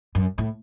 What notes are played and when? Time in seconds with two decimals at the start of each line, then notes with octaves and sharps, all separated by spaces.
0.15 F#2
0.38 A2